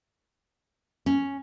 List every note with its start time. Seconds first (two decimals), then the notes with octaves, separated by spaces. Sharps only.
1.06 C#4